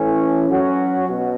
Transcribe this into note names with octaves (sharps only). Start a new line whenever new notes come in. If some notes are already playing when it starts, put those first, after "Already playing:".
Already playing: E3 A3 C#4
F#3 C#4 F#4
B2